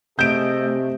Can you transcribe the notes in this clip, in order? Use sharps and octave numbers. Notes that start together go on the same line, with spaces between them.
C3 A3 G#4 A4 D#5 G6 D7